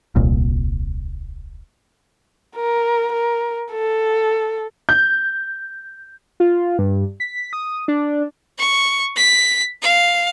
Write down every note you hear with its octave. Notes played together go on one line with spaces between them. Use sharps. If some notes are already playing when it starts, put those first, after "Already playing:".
D#1 C2 A#2
A#4
A#4
A4
G6
F4
G2
B6
D#6
D4
C#6
B6
F5